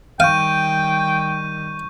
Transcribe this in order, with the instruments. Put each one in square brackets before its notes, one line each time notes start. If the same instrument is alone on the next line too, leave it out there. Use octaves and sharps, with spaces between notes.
[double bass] D#3 G3 [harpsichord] F5 [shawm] G5 [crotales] C#6 G6 D#7